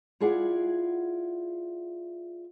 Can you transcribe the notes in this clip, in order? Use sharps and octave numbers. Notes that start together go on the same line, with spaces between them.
E4 F4 G#4 D5 E5 F#5